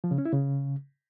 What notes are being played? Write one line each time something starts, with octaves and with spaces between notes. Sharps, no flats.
F3
C#3
C#4
E4
C#3